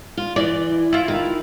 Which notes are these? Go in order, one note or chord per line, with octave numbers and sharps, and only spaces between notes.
F4
E3 D5
E4 F4
D#3